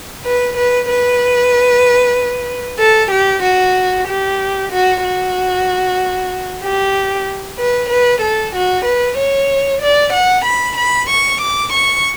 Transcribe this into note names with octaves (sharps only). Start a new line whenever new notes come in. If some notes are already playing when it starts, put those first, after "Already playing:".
B4
B4
B4
A4
G4
F#4
G4
F#4
F#4
G4
B4
B4
A4
F#4
B4
C#5
D5
F#5
B5
B5
C#6
D6
C#6